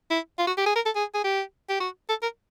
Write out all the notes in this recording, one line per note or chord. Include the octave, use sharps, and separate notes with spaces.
E4
F4
F#4
G4
G#4
A#4
A4
G#4
G#4
G4
G4
F#4
A4
A#4